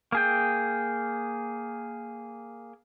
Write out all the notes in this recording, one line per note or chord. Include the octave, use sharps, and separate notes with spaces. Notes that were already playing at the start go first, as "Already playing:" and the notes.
A#3 G#4 G5